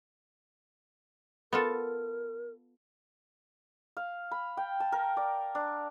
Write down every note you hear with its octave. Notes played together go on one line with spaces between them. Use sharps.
B3 F4 A4 A#4
F5
B5
G5
A5
A#4
D5
D4